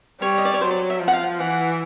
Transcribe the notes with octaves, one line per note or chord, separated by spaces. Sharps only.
G3 C#5
D#5
D5
C#5
F#3 C5
D5
E5
F3
F#5
F5
E3 F#5